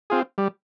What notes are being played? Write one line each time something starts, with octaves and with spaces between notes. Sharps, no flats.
C4 F4 G#4
G3